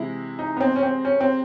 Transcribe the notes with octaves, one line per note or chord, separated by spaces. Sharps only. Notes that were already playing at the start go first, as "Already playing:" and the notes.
Already playing: C3 E3 G#3 E4
D#4
B3
C4
C#4
C4
C#4
C4